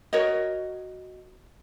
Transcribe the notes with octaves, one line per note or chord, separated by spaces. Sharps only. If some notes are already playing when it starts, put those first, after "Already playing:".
F#4 A#4 C#5 D#5